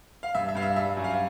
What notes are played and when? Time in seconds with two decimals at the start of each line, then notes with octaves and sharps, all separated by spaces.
0.23 F5
0.35 G2 E5
0.49 E5
0.55 G2 F5
0.62 E5
0.76 G3 E5
0.90 E5
0.97 F#2
1.04 F5